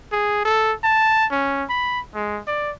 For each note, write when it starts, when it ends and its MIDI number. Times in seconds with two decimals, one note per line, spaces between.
0.12 0.44 68
0.45 0.73 69
0.84 1.26 81
1.31 1.64 61
1.69 2.00 83
2.15 2.40 56
2.47 2.71 74